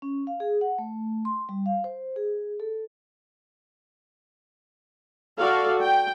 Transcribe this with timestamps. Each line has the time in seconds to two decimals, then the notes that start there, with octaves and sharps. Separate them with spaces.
0.02 C#4
0.27 F5
0.40 G#4
0.61 F#5
0.78 A3
1.25 C6
1.49 G3
1.66 F5
1.84 C5
2.16 G#4
2.60 A4
5.38 F#4 A4 D5 F5
5.79 G5